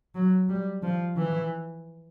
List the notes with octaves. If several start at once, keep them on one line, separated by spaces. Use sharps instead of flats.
F#3
G3
F3
E3